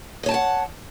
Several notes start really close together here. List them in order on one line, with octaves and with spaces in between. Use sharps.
D#5 C#5 A5 G5 F#5